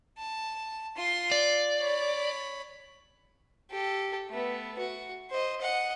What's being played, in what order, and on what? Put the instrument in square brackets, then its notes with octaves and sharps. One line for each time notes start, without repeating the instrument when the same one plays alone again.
[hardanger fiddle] A5
F4 C6
[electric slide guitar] D5
[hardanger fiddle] C#5 B5
[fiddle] G4 A4
A3 B3
F#4
C5 D#5
D#5 F#5